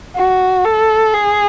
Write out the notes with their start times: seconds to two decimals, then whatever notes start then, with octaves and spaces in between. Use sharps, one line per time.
0.16 F#4
0.65 A4
1.14 G#4